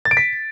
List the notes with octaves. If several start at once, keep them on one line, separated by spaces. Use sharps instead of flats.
A6
D7
B6